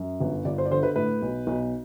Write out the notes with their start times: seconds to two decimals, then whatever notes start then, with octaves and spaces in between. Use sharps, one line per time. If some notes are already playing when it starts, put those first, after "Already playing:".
Already playing: F#2
0.20 G1
0.45 G1 D5
0.58 C5
0.65 D5
0.71 D3 C5
0.83 B4
0.96 A2 B4
1.22 B1
1.47 B1